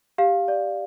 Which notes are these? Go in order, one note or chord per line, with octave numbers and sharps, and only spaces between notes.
G4 F5
D5